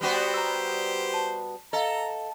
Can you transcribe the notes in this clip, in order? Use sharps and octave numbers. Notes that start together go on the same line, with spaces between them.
G3 B3 F#4 G4 C5
A#5 E6
A5
A4 D#5 F5 A#5